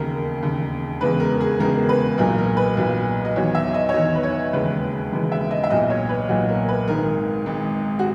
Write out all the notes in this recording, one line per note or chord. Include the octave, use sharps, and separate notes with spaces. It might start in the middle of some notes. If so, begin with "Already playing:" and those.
Already playing: E1 D#2 C#3 A#4
E1 D#2 C#3
E1 E2 C#3 G#3 B4
A#4
G#4
E1 E2 C#3 G#3 A#4
B4
B1 A#2 F#3 A#4
A#4
B4
B1 A#2 F#3
D#5
E2 D#3 F#3 C#5
E5
D#5
C#5
E2 D#3 F#3 D#5
B4
C#5
E1 D#2 C#3 E3 G#3 B4
E1 D#2 C#3 E3 G#3
E5
D#5
E5
B1 A#2 F#3 D#5
C#5
B4
B1 A#2 F#3 F#4
A#4
B4
G#1 G#2 D#3 A#4
G#1 G#2 D#3
F#4